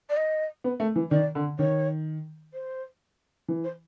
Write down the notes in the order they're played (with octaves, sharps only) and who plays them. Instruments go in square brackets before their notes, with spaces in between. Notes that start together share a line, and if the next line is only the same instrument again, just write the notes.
[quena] D5
D#5
[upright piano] B3
A3
E3
[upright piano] D#3 [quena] D5
[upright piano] D3
[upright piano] D#3 [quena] C#5
[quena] C5
[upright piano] E3
[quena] C5